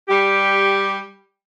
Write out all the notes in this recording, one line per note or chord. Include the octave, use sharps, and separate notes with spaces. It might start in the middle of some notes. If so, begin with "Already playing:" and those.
G3 G4